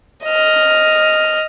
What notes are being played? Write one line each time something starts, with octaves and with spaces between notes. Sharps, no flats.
D#5 F6